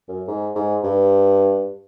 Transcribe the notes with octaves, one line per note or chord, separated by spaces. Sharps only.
F#2
G#2
G#2
G2